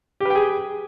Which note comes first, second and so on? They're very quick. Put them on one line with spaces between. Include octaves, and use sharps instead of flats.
G4 B4 G5 G#4